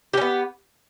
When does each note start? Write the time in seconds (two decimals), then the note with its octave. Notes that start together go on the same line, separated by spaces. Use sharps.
0.13 G4
0.17 C#4
0.21 B3